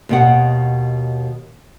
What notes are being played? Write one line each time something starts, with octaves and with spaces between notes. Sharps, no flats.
D#2 B2 F#5